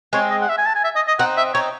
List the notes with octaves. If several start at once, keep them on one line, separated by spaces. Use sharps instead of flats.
G#3 C4 C#5
D#5
F#5
E5
G#5
A5
G#5
E5
D#5
D#5
C4 D#4 F#5
E5
C4 D#4 C#5